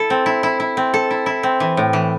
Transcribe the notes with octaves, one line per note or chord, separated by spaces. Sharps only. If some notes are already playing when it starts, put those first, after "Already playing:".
Already playing: E4 A4
C4
E4
E4
E4
C4
A4
E4
E4
C4
E3
A2
E3